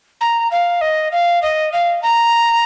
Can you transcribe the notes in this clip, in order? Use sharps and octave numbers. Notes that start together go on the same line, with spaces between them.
A#5
F5
D#5
F5
D#5
F5
A#5